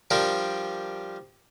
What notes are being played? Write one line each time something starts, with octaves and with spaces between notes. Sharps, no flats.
F3 G3 D4 A#4